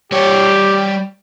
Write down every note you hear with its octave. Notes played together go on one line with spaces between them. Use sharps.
G3 G4 C#5